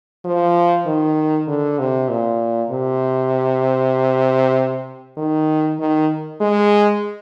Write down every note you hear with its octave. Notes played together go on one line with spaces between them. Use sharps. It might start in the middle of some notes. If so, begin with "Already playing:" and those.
F3
D#3
D3
C3
A#2
C3
D#3
D#3
G#3